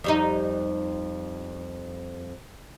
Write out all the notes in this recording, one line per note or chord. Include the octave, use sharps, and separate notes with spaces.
F2 G3 D#4